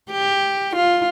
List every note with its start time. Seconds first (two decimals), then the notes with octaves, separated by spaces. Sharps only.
0.11 G4
0.76 F4